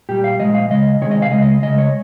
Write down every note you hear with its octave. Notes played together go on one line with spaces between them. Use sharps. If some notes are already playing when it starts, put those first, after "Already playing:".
A#2 G3 G4
F5
A#2 F3 G#3 D#5
F5
C#3 G#3 D#5
C3 D#3 G#3 C#5
D#5
F5
C#3 G#3 D#5
D#5
C#3 G#3 D#5
C#5